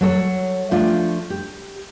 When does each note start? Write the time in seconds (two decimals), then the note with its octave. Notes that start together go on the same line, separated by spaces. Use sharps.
0.01 F#3 A4 C#5
0.71 F3 A3 D4 F4
1.30 G4